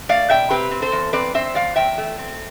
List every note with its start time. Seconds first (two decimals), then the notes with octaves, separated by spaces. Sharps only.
0.09 A3 D5 F5
0.30 B2 E5 G5
0.50 C4 G4 B4
0.71 C4
0.82 A4 C5
0.92 E2
1.13 C4 B4 D5
1.34 C4 C5 E5
1.55 E2 D5 F5
1.76 E2 E5 G5
1.98 A3
2.18 C4